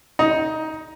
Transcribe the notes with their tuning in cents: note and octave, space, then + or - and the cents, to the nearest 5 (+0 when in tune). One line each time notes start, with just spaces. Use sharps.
D#4 +15